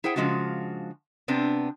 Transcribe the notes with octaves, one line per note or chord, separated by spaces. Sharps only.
E4 G#4 C5 F#5 G5
C#3 F3 G#3 D4 F#4
C3 B3 C4 D4